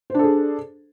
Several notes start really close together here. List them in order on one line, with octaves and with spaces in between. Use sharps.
C5 D4 A4 G#4